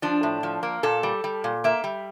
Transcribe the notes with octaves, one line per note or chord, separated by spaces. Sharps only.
F3 D4
A2
F3
A#3
A#2 A4
G3
G3
A#2
A#3 E5
G3